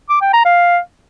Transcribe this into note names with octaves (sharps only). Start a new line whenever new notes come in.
D6
G5
A#5
F5